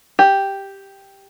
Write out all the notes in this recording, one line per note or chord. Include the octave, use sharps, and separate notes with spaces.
G4